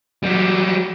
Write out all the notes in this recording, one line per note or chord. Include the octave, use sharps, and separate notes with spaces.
F#3 G3